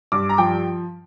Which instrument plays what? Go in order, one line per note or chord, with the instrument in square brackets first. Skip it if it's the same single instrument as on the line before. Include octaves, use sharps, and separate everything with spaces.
[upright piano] G2 D6
A#5
F3 G5